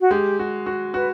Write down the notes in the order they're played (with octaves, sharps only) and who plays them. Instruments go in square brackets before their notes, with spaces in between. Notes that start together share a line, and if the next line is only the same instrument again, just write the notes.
[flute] F#4
[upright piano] G#3 [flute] G4
[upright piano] F#4
F#4
[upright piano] F#4 [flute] B4